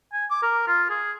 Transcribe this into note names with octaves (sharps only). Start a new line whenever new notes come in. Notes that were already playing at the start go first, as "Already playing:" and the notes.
G#5
D6
A#4
F4
G#4